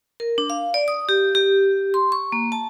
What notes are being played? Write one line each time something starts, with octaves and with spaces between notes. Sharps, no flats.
A#4
D4
F5
D5
D#6
G4
G4
C6
C#6
A#3
A5